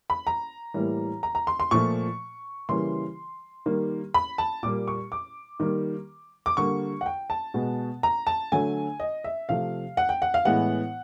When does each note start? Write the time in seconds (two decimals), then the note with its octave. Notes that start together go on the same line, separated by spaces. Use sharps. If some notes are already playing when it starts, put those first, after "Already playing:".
0.10 B5
0.27 A#5
0.74 A2 E3 G3 A#3
1.23 A#5
1.35 A#5
1.47 C6
1.60 C6
1.71 A#2 F3 A3 C#6
2.69 C#3 E3 G3 A#3 C6
3.66 D#3 G3 A#3
4.14 B5
4.38 A5
4.63 A#2 G3 A#3 D6
4.88 C#6
5.12 D6
5.60 D#3 G3 A#3
6.46 D6
6.57 D3 G3 A#3 C#6
7.01 F#5
7.06 G5
7.30 A5
7.54 B2 G#3 B3
8.03 A#5
8.27 A5
8.52 D3 F#3 A3 G#5
9.00 D#5
9.24 E5
9.49 C3 F3 A3 F5
9.97 F#5
10.09 G5
10.22 F#5
10.34 F5
10.45 A2 E3 G#3 B3 F#5